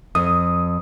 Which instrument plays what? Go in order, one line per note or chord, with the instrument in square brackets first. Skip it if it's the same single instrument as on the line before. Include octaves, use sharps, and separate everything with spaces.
[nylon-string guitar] F2 [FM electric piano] D#6